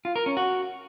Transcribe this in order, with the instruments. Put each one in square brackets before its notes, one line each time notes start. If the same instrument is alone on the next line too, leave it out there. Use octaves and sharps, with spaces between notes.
[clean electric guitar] F4
A#4
C#4
F#4